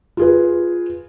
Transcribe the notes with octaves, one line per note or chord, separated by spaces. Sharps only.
F4 G#4 B4